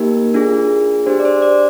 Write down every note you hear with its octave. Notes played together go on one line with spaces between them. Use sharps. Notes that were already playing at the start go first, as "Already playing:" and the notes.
Already playing: A#3 D#4 G4 A#4
D4 F4 G#4
D4 G4 C5
D5
C5
D5